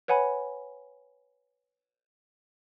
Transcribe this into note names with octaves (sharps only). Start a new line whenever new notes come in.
B4 C#5 F#5 G#5 B5